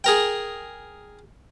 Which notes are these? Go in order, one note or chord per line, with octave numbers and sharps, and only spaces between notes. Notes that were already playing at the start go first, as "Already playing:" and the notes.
G#4 A#4 G5